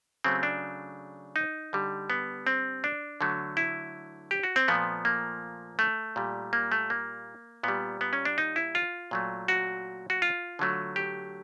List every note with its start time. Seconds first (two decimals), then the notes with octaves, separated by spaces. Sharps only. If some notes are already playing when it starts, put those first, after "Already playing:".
0.24 C#3 F#3 A3 C4
0.43 D4
1.36 D#4
1.73 D3 G3
2.10 B3
2.47 C4
2.84 D4
3.21 D3 F#3 A3
3.57 E4
4.31 G4
4.43 F#4
4.56 C4
4.68 A#2 F3 A3 B3
5.05 A#3
5.79 A3
6.16 A#2 G3
6.53 A#3
6.72 A3
6.90 A#3
7.63 A#2 G3 B3
8.01 B3
8.13 C#4
8.25 D4
8.38 D#4
8.56 E4
8.75 F4
9.11 A#2 F#3 A3
9.48 F#4
10.10 F#4
10.22 F4
10.59 D3 F#3 A3
10.96 G4